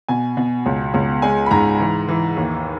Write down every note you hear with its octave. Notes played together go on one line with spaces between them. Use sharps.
B2 G#5
B2
C#2
C#2
G#3 G#5
B5
G#2 A#5
E3
E3
D#2